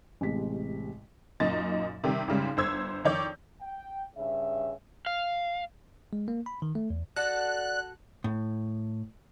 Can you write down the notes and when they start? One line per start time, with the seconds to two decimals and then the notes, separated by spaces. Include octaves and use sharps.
0.21 A1 C3 G#3 B6
1.40 F#2 A#2 D#4 D#5 A6
2.04 C3 D#3 G3
2.28 G#1 G#2 C#3 G3
2.57 G1 C5 E6 G#6
3.05 F2 D#3 C#5 D5 C#6 G6
3.61 G5
4.16 G2 C#3 E5
5.06 F5
6.13 G#3
6.28 A#3
6.46 B5
6.62 D#3
6.75 A3
6.90 E2
7.16 F#4 A4 D5 F#5 F#6
8.24 A2